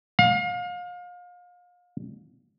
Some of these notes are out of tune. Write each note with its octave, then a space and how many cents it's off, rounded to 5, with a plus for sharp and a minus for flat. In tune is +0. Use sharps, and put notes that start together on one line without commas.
F5 +35